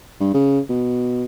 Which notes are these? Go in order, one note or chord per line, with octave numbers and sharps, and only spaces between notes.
G2
C#3
B2